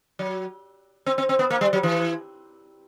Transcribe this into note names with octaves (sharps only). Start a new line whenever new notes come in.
F#3
C4
C4
C4
B3
A#3
G3
F#3
E3